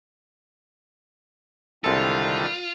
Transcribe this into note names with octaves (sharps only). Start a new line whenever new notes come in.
C2 D3 D#3 G3 G#3 F4 A4